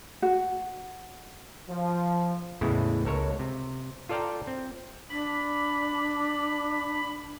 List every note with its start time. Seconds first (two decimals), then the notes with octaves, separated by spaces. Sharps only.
0.22 F#4
1.69 F3
2.61 E2 A2 C#3 E3 G#3 E4
3.05 C#2 A4 A#4 C#5
3.39 C3
4.09 F4 A4 D5 F5 G5 A#5
4.47 C4
5.10 D4 B5